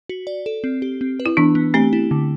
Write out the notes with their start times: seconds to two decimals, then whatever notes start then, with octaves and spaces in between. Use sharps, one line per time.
0.09 F#4
0.27 D5
0.46 A4
0.64 C4
0.82 G4
1.01 C4
1.20 B4
1.26 E4
1.37 E3 B3 D4
1.55 B3
1.74 A3 C4 G4
1.93 E4
2.11 D3